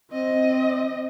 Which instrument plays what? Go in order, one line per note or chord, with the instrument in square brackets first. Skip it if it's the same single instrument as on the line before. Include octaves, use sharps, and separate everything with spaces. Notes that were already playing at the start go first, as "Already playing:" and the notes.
[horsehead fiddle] C4 D#5